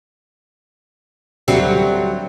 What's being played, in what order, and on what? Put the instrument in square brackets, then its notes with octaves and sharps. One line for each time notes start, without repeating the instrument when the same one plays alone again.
[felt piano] D2 [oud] F#3 G3 C4